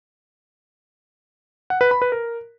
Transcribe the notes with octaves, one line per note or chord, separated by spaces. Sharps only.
F#5
B4
B5
B4
A#4